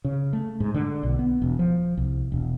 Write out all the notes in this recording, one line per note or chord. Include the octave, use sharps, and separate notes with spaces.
C#3
A3
G#2
D3
B1
B3
E1
F3
C2
E1